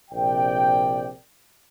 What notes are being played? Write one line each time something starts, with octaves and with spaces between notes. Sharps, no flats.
A#1 C3 D5 G5